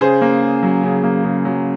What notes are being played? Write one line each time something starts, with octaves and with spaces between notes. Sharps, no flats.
C#3 G#4 C5
A#3
C#3
F#3
C#3
A#3
C#3
F#3